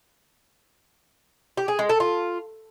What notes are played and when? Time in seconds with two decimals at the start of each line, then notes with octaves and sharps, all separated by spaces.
1.57 G4
1.68 G#4
1.79 G#3
1.89 A4
2.00 F4